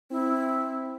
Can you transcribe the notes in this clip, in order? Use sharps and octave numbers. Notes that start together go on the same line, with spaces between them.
C4 E4